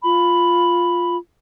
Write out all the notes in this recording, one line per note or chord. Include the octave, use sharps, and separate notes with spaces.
F4 B5